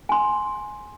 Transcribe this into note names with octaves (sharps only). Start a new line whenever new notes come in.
G#5 C6